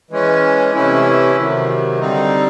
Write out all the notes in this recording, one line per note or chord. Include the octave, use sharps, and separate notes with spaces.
E3 G#3 C#4
C3 E3 A3 C#4 E4
C3 D#3 F#3
D3 G3 C4 D#4